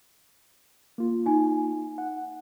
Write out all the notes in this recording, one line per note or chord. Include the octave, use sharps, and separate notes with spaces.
A#3 F4
D#4 G#5
F#5